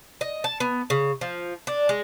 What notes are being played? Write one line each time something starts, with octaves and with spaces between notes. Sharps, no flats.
D#5
A5
B3
C#3
F3
D4
G#3